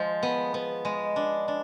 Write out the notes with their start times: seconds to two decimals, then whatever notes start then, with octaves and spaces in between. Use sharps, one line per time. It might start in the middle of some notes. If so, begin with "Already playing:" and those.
Already playing: F3 G#3
0.23 B3
0.54 B3
0.85 G#3
1.16 D4
1.48 D4